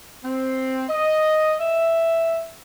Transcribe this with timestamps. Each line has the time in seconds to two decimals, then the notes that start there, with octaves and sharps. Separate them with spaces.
0.23 C4
0.89 D#5
1.60 E5